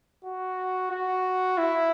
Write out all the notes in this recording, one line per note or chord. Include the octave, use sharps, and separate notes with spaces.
F#4
F#4
E4